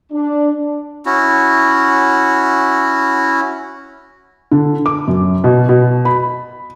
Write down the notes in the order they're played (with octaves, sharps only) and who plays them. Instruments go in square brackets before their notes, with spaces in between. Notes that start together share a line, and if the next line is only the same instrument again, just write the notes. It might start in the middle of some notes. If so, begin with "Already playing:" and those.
[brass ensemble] D4
[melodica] C#4 E4 F#4
[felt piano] D3
D6
F#2
B2
B2
B5